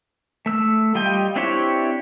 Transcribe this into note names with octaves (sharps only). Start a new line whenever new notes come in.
A3 E6
G3 F4 D#5 G5
C4 D4 E4 G4 C#5